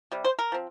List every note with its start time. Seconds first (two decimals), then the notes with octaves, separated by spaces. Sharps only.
0.12 C3 G3
0.25 C5
0.39 A#4
0.52 F3 C4